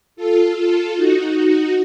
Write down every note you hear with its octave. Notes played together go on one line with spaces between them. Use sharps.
F4 A4
F4 A4
D#4 F#4
D#4 F#4